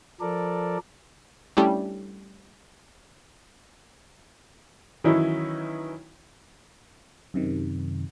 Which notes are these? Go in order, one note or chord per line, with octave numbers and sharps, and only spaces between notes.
F3 A4 A#4 D5
G3 A3 C#4 D4 E4 G4
D#3 E3 F#3 C#4 D#4 E4
F#2 C3 D#3